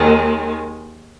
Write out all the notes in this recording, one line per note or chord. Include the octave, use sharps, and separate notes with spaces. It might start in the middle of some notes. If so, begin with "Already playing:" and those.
Already playing: D#2 D#3 G#3